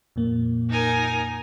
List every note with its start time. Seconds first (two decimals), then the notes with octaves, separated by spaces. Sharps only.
0.16 F2 A#2 A#3
0.70 D#4 A#4 G#5